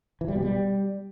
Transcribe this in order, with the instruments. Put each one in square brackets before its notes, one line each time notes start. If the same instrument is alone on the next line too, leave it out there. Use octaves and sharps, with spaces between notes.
[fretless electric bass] E3
G3
B2
G3